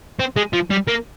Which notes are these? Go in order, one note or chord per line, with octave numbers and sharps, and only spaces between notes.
C4
G#3
F3
G3
A#3